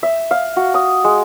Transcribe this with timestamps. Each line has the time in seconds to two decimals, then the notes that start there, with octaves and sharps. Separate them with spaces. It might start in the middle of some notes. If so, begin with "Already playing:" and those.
0.03 E5
0.31 F5
0.56 F#4
0.74 D#6
1.04 G#3